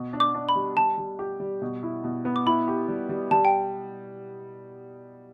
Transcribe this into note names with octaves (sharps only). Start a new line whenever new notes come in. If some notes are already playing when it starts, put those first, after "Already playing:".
Already playing: B2
D4
D6
D4
B5
G3
G3 A5
G3
G4
G3
B2
E4
B2
B3
D6
E4 B5
G4
G3
G3
G3 A5
G5